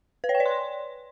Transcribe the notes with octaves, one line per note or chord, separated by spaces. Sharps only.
B4
C#5
G5
D5
C6